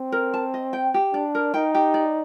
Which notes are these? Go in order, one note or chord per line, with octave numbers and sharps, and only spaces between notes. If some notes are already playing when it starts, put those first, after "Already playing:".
Already playing: C4
A#4
A5
D#5
G5
G4
D4 D5
A#4
D#4 G5
G4
D5